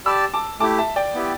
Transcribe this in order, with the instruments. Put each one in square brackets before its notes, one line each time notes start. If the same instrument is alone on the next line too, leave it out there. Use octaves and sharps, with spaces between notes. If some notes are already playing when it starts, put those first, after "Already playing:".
[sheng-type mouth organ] G4 D5 A5 [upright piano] B5 E6
[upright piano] A5 D6
[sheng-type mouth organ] A3 E4 G4 [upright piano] A5 D6
[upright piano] E5 A5
D5 G5
[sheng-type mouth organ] B3 E4 G4